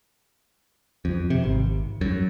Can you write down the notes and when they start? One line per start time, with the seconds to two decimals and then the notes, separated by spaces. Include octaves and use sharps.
1.05 F2
1.30 C3
1.44 G#1
2.01 F#2